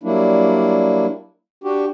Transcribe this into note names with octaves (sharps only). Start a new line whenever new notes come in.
F#3 G3 A#3 D4 E4
D4 F#4 G4